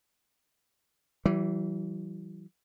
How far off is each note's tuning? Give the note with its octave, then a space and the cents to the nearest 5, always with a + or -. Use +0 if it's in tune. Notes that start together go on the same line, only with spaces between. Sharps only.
E3 +10 G3 -40